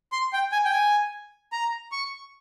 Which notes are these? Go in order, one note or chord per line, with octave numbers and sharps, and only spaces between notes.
C6
G5
G#5
G5
G#5
A#5
C#6